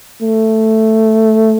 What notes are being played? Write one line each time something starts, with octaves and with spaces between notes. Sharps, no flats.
A3